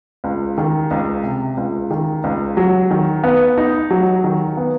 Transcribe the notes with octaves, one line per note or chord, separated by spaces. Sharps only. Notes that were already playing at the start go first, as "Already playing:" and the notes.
C#2
D#3
C#2
C3
C#2
D#3
C#2
F#3
D#3
B3
D#4
F#3
D#3
B3